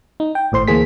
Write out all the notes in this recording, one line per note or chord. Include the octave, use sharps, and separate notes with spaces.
D#4
G5
G#1 A2 C5 C6
D2 E3 A#3 G#4 C5 B6